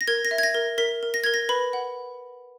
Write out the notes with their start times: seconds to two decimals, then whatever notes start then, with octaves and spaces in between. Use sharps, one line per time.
0.01 A#6
0.08 A#4 G#6
0.25 A#6
0.31 E5
0.38 G#6
0.43 A#6
0.55 A#4
0.78 A#4 B6
1.03 A#4
1.14 A#6
1.24 A#4 G#6
1.34 A#6
1.49 B4 B5
1.73 F#5